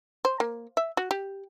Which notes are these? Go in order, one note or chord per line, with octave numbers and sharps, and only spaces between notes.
C5
A#3
E5
F#4
G4